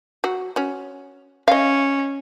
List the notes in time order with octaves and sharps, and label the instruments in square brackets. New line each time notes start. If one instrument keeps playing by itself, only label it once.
[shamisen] F#3 F#4
C#4 F#4
[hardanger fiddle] C#4 [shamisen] D#5 F5